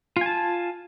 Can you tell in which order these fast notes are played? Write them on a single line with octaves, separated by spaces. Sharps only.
F4 G#5 A5